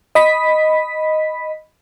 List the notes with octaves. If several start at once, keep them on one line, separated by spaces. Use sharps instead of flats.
D#5 B5 B6